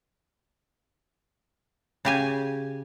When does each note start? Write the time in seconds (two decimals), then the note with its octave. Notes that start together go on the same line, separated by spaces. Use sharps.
2.05 C#3 G4 G#5